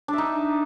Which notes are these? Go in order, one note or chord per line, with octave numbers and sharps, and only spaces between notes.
D4 D#4 E5